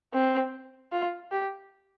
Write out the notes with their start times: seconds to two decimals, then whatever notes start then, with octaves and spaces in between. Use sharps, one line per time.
0.13 C4
0.92 F4
1.32 G4